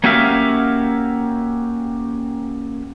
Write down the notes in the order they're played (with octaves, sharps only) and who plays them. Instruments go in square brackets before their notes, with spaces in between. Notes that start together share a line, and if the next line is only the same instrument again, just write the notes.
[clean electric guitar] A#3 C#4 F#4 G4 E5 F5